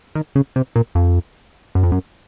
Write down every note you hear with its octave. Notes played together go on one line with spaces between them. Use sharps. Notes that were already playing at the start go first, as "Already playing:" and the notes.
D#3
C#3
C3
A#2
F2
F#2
F2
F#2